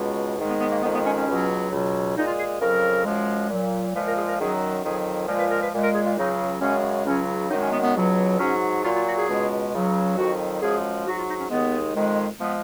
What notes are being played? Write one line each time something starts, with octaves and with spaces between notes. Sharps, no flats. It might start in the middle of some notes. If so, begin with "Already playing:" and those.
Already playing: C#2 B2 G#3
G#2 D#3 G#3
B3
B3
A#3
F2 D#3 G#3 B3
B3
C#4
C#4
C#2 B2 F#3
C#2 B2 F#3
A#2 G#3 D#4
F4
G#4
F2 C#3 F#3 A#4
F#2 F3 G#3
A#2 F#3
A#2 F3 G#3 B4
A#4
G#4
A#4
F#2 D#3 F#3 G#4
F2 D#3 F#3 G#4
A#2 F3 G#3 A#4
B4
A#4
B4
A#2 G#3
A#4
G#4
F4
C#2 C#3 F#3 D#4
F#2 C#3 G#3 C#4
C#2 C#3 F#3 C#4
F#2 D#3 G#3 D#4
C#4
B3
B3
C#2 B2 F#3
G#2 F#3 C#4
A#2 F#3 F4
F4
F#4
G#4
C#2 B2 G#3
C#2 C#3 F#3
F2 D#3 F#3 F#4
F#2 F3 G#3 G#4
G#2 F#3 F#4
F4
D#4
C#4
D#2 D#3 G#3 B3
F2 D#3 G#3
F3 G#3 B3